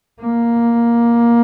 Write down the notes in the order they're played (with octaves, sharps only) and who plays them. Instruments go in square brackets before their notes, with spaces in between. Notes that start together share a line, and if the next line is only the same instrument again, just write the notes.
[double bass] A#3